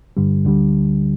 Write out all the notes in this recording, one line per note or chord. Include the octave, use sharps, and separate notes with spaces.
G2 D3 G3
D2 D3 G3